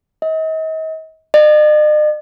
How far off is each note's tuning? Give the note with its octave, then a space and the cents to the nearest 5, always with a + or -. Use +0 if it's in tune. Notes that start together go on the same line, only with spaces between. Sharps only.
D#5 +40
D#5 -45